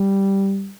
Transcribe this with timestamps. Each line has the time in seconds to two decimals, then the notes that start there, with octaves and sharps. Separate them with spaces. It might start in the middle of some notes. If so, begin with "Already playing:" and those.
Already playing: G3